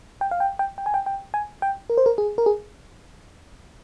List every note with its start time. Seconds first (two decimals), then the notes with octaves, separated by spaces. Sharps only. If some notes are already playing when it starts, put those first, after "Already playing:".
0.21 G5
0.31 F5
0.40 G5
0.59 G5
0.78 G5
0.86 G#5
0.94 G5
1.06 G5
1.34 G#5
1.62 G5
1.90 A#4
1.98 C5
2.06 A#4
2.18 G#4
2.38 A#4
2.46 G#4